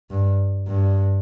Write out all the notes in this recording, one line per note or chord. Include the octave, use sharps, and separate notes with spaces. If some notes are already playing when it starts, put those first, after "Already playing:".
G2
G2